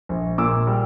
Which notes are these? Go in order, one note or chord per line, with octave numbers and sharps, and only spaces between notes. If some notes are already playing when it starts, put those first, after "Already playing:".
A#1
A#2 D6 E6
G3